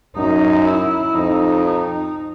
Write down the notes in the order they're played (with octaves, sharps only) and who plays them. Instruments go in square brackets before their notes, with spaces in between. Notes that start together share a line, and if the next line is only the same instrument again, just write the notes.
[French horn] F#2 [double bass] D#4
[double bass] E4
[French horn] F2 [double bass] D#4
[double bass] D#4